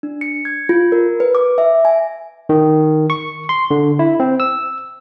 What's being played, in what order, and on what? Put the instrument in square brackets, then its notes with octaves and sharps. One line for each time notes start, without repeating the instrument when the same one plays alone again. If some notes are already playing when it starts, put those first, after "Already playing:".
[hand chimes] D4
C#7
G#6
F4
A#4
B4
D6
E5
G#5
[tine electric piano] D#3
C#6
C6
D3
E4
C4
E6